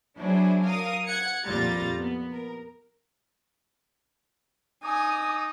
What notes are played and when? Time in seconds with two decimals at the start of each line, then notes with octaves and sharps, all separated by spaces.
0.18 F#3 D4 E4 G#4 C5
0.63 A#4 F5 D#6
1.05 F#5 G#6 C#7
1.45 F2 A#2 G3 F4 A#5 A6
1.99 B3
2.31 A#4
4.83 D#4 G#5 D6 D#6